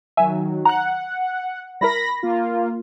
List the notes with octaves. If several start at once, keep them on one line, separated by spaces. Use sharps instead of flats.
D#3 F#3 E5 G#5
F#5 A#5 F#6
G3 E4 A#4 B5 A#6
A#3 F4